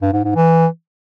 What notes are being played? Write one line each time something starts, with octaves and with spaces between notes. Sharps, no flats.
G2
G#2
G#2
E3